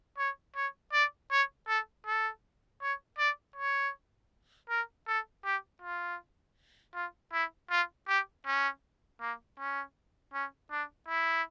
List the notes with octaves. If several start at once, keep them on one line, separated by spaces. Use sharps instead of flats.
C#5
C#5
D5
C#5
A4
A4
C#5
D5
C#5
A#4
A4
G4
F4
F4
E4
F4
G4
C#4
A#3
C#4
C#4
D4
E4